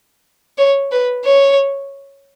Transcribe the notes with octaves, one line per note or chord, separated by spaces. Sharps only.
C#5
B4
C#5